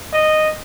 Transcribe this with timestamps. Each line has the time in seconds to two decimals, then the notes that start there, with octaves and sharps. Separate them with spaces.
0.13 D#5